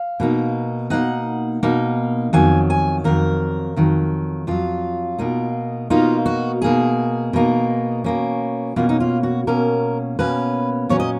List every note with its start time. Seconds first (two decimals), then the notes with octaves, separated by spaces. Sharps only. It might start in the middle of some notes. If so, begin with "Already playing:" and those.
Already playing: F5
0.20 B2 A#3 D#4
0.90 B2 A#3 D#4 F#5
1.63 B2 A#3 D#4
2.33 F2 D#3 F#3 G#5
2.70 G#5
3.04 F2 D#3 F#3 A#4
3.76 F2 D#3 F#3
4.47 F2 D#3 F#3 F4
5.18 B2 A#3 D#4
5.90 B2 A#3 D#4 F4
6.26 F#4
6.62 B2 A#3 D#4 G#4
7.33 B2 A#3 D#4
8.04 B2 A#3 C#4
8.76 B2 A#3 C#4 F4
8.89 D#4
9.00 F4
9.23 F#4
9.47 B2 A#3 C#4 A#4
10.19 B2 A#3 C#4 B4
10.89 A#2 F#3 C#4 C#5
11.00 D#5